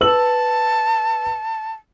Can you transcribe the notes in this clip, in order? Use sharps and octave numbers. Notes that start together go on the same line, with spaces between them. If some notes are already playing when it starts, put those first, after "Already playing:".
B4 A5 E6 F#7